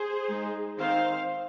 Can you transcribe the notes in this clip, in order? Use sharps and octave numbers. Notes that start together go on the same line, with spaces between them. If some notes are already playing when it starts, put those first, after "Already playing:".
Already playing: G#4 C5
G#3 D#4
D#3 C4 D#4 C5 F5